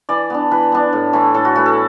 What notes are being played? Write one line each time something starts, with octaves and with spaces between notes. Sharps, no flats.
E3 D5
B3 D4
E3 B4
B3 D4
A2
E3 A3 E4
A2 A4
F#4
E3 A3 E4 F#4
A4